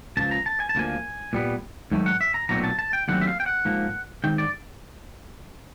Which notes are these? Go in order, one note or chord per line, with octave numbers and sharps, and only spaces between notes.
C#2 C#3 F3 A5
A#5
A5
G#5
A5
D2 C#3 F3 A#3 G#5
A#2 G3 B3
G#2 D#3 F#3 A3
F#5
E5
A#5
B1 A#2 F#3 A3 C4 A#5
A5
A5
G5
D#2 D3 F#3 A3 C4 F#5
E5
F5
G5
F#5
G#2 F3 A#3
G#2 D#3 G5
D5